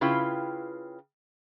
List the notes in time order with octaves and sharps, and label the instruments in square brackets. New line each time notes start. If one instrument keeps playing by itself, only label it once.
[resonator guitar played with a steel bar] C#3 E4 F4 B4 G5